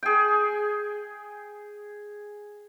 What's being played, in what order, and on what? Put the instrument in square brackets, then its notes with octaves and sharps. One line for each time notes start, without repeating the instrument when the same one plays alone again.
[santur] G#4 G5